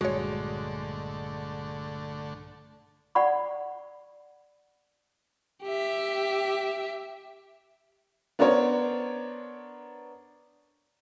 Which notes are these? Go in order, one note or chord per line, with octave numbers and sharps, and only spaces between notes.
A#1 G2 D3 G#3 A3 F#4 C#5
D5 F#5 B5 C#6
G4 E5
B3 D4 A#4 C5 C#5